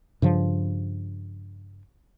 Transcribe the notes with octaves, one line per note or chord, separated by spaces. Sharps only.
G2 C#3 F3